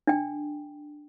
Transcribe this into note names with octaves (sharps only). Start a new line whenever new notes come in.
D4 G5